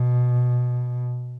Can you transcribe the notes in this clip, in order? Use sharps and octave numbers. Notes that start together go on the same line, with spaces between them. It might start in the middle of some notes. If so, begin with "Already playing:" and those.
Already playing: B2